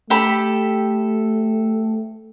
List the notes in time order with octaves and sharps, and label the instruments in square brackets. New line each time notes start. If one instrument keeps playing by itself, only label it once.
[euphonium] A3 [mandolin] G4 A4 B5